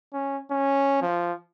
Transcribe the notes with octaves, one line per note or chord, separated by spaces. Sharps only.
C#4
C#4
F3